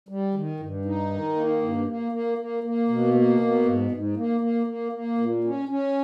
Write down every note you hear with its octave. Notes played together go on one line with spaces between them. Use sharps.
G3
D#3
G2
D#4
D#3
A#3
G2
A#3
A#3
A#3
A#3
B2
A#3
B2
G#2
G#2
A#3
A#3
A#3
A#3
A#2
C#4
C#4